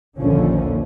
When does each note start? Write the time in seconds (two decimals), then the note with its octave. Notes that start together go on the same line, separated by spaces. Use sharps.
0.20 A#1 D#2 D3 F3 C#4